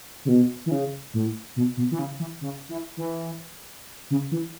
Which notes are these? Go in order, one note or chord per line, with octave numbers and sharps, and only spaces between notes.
C#3
B2
E3
C#3
A2
B2
B2
E3
C#3
E3
C#3
E3
E3
C#3
E3